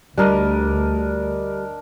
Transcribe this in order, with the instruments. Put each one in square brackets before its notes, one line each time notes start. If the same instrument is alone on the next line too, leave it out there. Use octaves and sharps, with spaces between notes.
[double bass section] D2 [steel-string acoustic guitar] G3 [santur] D4 A#4 D#5